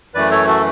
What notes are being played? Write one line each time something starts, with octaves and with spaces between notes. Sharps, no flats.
F#2 E3 A3 B4 D5
A4 C#5
F#4 A4